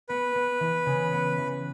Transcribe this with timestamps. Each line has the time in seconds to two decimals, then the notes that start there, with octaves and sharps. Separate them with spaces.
0.09 B3 B4
0.35 B3
0.60 E3
0.86 C#3
1.12 B3
1.38 E3